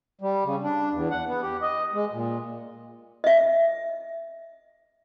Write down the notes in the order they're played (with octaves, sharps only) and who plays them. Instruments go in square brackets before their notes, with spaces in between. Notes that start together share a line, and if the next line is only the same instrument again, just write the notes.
[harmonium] G3
C#3
D4
E2
F#5
B3
G4
D#5
G#3
A#2
[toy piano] D#5 E5